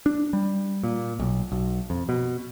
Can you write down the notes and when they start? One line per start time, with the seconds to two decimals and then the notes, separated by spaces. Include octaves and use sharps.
0.06 D4
0.33 G3
0.83 A#2
1.19 B1
1.52 B1
1.90 F2
2.09 B2